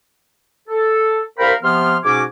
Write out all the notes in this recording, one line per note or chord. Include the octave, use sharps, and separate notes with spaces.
A4
C2 A#4 C5 F5 G5 B5
C3 F3 B3 C6 F6
G#2 B2 C#4 F#4 G#5 D6